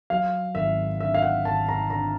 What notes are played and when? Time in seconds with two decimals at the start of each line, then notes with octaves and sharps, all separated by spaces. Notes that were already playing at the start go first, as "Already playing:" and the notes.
0.10 F#3 F5
0.55 G#1 E5
1.00 D3 E5
1.14 F5
1.22 F#5
1.45 G#1 A5
1.69 A#5
1.90 D3 A#5